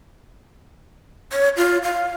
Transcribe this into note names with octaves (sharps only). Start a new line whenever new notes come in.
C#5
F4
F5